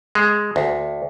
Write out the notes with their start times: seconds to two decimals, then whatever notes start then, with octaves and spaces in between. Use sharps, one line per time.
0.15 G#3
0.56 D2